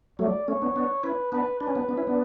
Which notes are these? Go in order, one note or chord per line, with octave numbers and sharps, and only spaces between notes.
F#3 A3 D5
A3 C#4 C#5
B3 D4
B3 D4
C#4 E4 B4
B3 D4 B4
D4 B4
C#4
B3 D4
B3 D4
C#4 E4
B3 D4